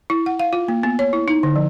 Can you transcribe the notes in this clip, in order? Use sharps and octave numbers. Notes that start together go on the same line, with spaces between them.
E4
F#5
F5
F4
A#3
B3
C#5
E4
D#4
D3
F3